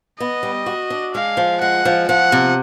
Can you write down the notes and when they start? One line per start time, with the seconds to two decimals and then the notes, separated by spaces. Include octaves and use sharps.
0.20 B3 D#5
0.43 G3
0.66 F#4
0.90 D4
1.14 G#3 F5
1.37 F3
1.61 G#3 F#5
1.85 F3
2.08 F3 F#5
2.32 C3